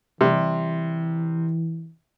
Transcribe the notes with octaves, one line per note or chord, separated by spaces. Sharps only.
C3 E3 G3